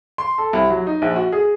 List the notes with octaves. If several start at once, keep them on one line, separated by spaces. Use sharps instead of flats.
C6
A4
C2
F#3
D#4
A#1
F#4
G#4